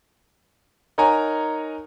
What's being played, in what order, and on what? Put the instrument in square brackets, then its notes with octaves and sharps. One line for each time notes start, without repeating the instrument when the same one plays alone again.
[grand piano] D#4 A#4 C#5 F#5 G#5 A#5